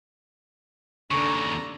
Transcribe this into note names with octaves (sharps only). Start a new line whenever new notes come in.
D#2 C#3 D4 A4 A#5 C#6